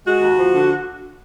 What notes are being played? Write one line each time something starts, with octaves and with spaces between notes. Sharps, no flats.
G#3 F#4
D#2
F3
D3